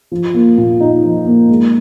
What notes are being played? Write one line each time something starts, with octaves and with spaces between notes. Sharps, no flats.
F3
A#3
A#2
D#4
F3
A#3
G#3